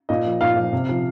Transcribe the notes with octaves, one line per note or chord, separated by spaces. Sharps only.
A#2 D#5
F3
A#2 F5
F3
C3
F3